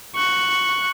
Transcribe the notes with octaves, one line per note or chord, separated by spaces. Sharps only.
C#6 F#6